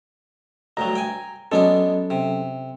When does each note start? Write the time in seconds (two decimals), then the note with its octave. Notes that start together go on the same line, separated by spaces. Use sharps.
0.77 D2 G2 F#3 A#5
0.95 G5 G#5
1.52 F#3 G#3 B3 C#4 D4 A4
2.10 C3